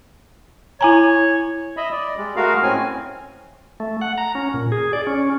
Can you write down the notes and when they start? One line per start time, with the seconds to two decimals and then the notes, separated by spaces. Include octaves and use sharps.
0.81 E4 C#5 G#5 A#5
1.77 D#5 E5 B5
1.92 D5
2.17 G3 G#3
2.36 G#3 A3 F#4 A#4 F5
2.63 A2 C4 C#4 G#5
3.80 A3
4.01 F#5
4.18 A#5
4.35 C#4
4.54 A#2
4.72 G#4
4.93 D5
5.07 C#4